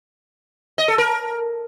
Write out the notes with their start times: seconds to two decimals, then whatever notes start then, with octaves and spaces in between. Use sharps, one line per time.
0.78 D#5
0.88 A4
0.98 A#4